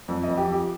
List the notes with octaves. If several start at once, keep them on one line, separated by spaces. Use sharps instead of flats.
F2
D#5
F2
G4
F3 G4